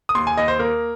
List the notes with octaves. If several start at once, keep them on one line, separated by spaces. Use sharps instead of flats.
D#6
D#2 C6
G#5
D#2 D#5
C5
A#3 A#4